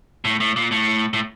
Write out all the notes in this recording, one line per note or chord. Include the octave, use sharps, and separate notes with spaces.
A2
A2
A#2
A2
A2